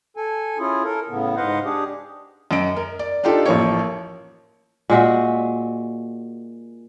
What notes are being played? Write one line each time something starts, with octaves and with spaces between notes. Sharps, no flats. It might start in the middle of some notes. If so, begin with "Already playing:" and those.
A4 G#5
C#4 E4 F4 G#4
A4 A#4
A2 C#3 B3
G#2 B4 C5 D#5 F5 F#5
D4 G4 G#4
F#2 D#5 D7
A#4
D5
D4 D#4 F4 G4 A4
A1 F3 A#3 C#5
A#2 G#3 F#4 E5